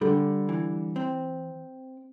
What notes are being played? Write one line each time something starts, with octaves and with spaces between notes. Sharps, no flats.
D3 G3
E3
C4